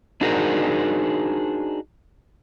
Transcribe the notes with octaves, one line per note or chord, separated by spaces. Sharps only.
D4 D#4 F#4 G#4 A#4 C5